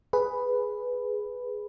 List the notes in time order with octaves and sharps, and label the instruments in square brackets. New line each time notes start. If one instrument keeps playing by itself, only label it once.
[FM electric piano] G#4 B4